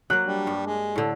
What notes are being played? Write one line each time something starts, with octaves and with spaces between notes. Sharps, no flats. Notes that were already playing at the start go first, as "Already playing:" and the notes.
F#3 A#3 F#6
G3 D4
G2
G#3
A2 D3 A4